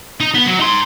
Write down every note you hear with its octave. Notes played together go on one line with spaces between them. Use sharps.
D#4
B3
F#3
D#4 C6